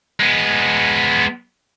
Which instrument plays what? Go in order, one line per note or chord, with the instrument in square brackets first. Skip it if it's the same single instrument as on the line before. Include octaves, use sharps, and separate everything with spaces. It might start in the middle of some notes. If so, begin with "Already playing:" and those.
[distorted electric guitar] G#3 B3